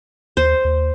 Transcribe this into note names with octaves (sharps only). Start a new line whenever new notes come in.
D#2 C5
D#2